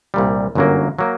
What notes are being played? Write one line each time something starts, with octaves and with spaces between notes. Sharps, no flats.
C2 A#2 G3
G1 F#2 F#3 A#3
F#3 A#3